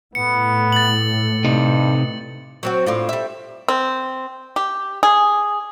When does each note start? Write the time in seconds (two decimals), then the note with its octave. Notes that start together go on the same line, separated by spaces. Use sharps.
0.15 A2 B3 C#7
0.72 A6 F#7
1.44 G2 C3 D#4
2.63 F#3 C4 F#4
2.86 A2 D4 F4
3.09 G3 E5
3.68 C4
4.56 G4
5.03 G#4